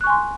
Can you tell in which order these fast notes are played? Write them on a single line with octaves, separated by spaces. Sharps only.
F#6 C#6 G#5 C6